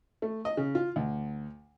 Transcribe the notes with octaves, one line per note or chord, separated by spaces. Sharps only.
A3
D#5
C#3
F4
D2